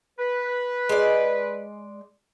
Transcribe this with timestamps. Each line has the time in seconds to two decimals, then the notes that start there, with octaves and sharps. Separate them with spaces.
0.19 B4
0.89 G#3 D5